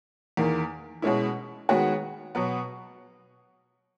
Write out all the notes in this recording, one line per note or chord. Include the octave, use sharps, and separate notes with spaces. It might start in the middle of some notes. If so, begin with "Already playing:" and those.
E2 D#3 A#3
B2 G#3 C#4 E4
D#3 G#3 B3 F#4 C#5
B2 F#3 B3